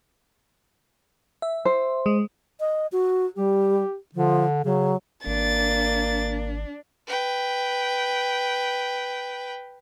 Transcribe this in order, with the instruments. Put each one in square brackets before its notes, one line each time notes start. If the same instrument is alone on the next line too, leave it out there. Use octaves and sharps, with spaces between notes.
[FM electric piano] E5
[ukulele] C5
[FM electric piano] G#3
[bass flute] D#5
F#4
[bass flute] G3 [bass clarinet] G4
[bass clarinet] D3 [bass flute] F3
[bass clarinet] C#3 [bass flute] F#3
[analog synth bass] G#1 [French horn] A#3 [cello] D4 [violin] A6
[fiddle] B4 G5